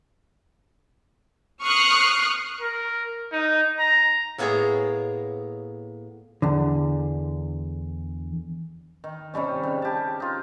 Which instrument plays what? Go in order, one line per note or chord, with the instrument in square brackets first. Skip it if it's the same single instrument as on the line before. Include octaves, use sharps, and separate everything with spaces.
[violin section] C#6 D#6 F6 F#6 C7
[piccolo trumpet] A#4
D#4
A#5
[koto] A2 A#3 B3 G#4 C#5 A#5
[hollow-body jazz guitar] E2 D3
[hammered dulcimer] D#3
C3 D#3 G3 C#4
C#3
G4 A5
D#4 F4